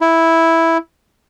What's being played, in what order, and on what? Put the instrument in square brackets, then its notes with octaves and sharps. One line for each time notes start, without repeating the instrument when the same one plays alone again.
[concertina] E4